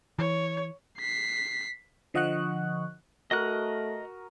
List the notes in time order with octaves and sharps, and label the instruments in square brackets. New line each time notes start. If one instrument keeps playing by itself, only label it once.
[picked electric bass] E3 [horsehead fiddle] C#5
[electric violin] B6 C7
[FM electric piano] D3 F3 D#5 F#5 C#6 F#6
[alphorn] A3 [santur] F#4 A#4 D#6 [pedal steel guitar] D#5 F#6